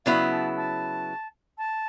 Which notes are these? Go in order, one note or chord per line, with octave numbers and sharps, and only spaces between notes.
C#3 F#3 B3 E4 F5
A5
A5
A5